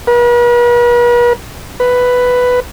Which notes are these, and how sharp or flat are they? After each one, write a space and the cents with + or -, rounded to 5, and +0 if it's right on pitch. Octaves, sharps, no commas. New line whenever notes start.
B4 -45
B4 +5